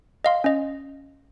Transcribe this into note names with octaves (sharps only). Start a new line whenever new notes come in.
D#5 F5 C6
C#4 D#5